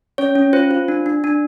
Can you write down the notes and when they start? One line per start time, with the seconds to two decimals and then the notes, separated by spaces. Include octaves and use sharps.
0.18 C#4 C#5
0.36 C#4
0.53 F4 C5
0.71 F4
0.88 D4
1.06 D4
1.24 D4